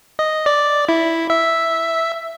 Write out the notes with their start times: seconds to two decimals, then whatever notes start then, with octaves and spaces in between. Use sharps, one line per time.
0.19 D#5
0.46 D5
0.89 E4
1.30 E5